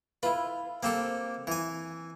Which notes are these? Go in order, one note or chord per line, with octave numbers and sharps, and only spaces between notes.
E4 F4 B4
A#3 C4 G4 A4
E3 G#5